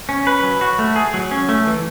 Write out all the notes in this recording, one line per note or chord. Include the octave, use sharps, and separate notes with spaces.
C#4
B4
F#3
F#4
A3
G#4
F#3
C#4
A3
E3